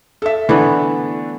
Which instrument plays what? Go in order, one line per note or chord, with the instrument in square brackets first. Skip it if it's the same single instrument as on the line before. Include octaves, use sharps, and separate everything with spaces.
[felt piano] A4 E5
[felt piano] D3 A3 D4 [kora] E3 B3